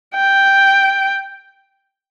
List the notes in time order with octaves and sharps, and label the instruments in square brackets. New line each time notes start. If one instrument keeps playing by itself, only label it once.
[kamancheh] G5